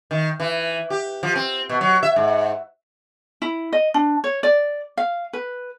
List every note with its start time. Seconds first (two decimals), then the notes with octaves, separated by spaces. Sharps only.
0.11 D#3
0.40 E3
0.90 G4
1.23 F3
1.35 C4
1.69 B2
1.81 F#3
2.03 E5
2.16 G#2
3.42 E4
3.73 D#5
3.94 D4
4.24 C#5
4.43 D5
4.97 F5
5.33 B4